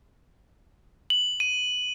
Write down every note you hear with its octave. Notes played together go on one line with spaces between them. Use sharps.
F#7
D#7